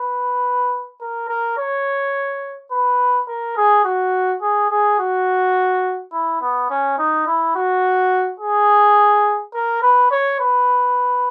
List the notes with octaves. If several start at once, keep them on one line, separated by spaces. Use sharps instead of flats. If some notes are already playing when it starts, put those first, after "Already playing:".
Already playing: B4
A#4
A#4
C#5
B4
A#4
G#4
F#4
G#4
G#4
F#4
E4
B3
C#4
D#4
E4
F#4
G#4
A#4
B4
C#5
B4